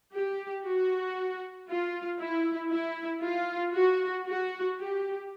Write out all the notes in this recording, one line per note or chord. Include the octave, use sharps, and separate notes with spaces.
G4
F#4
F4
E4
E4
F4
F#4
F#4
G4